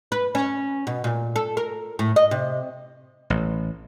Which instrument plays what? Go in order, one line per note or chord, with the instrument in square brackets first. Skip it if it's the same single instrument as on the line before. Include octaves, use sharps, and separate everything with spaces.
[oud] B4
C#4
B2
A#2
A4
A#4
A2
D#5
C3
[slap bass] A1